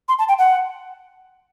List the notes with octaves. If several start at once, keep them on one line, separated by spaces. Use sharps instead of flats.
C6
A5
G5
F#5